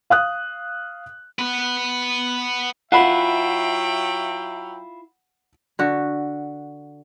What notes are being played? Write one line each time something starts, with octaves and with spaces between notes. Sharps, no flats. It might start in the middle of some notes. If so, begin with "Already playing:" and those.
F5 D#6 F#6
B3 B4
F#3 E4 F4 E5 F#5 G5 B5
D3 F#4